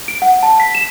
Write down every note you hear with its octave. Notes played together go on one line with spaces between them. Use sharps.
D7
F#5
A5
B6
E7